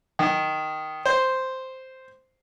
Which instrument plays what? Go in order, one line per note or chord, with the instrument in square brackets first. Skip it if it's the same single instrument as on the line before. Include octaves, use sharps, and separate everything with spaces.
[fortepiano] D#3
C5